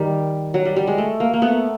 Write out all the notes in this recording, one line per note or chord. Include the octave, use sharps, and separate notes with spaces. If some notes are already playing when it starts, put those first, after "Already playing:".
Already playing: D#3 G3
F#3
G3
G3
G#3
A3
A#3
A#3
A3 B3